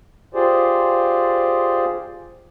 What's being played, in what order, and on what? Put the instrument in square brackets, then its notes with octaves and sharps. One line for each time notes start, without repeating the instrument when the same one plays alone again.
[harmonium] F4 G4 G#4 C5 D5